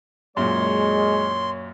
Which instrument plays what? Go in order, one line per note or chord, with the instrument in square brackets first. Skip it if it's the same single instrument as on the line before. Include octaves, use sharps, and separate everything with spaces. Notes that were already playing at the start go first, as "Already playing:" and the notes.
[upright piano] F#2 A#2 [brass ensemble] G#3 [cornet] C#5 [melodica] C6